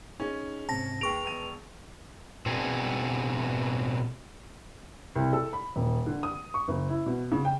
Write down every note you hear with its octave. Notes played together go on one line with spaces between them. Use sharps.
C#4 D#4 G#4 D#5
G#2 C3 C4 A5 A#6
D#2 G#4 B4 C6 C#6 D7 F7
E1 D#7
B2 C4 D4 F#4 G#4
C2
A4
B5
D#1
D3
D#6
C#6
F#1
E4
B2
C#3
G5